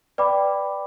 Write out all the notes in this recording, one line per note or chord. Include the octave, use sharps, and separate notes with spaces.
B4 D5 G5 B5 D6